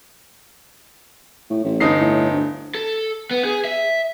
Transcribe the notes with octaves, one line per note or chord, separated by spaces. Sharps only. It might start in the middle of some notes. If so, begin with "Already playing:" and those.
A2
A1
G1 D#4 C7
A2
D2
A4
B3
G#4
E5